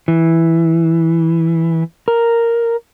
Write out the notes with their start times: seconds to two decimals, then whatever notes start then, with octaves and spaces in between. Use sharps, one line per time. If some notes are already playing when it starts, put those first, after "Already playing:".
0.08 E3
2.08 A#4